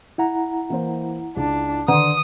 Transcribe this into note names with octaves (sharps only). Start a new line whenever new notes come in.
E4 F#5 A#5
E3 A#3 C5
C#2 D4
D3 D#3 F#5 C6 D#6